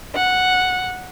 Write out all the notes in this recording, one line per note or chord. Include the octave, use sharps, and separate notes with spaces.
F#5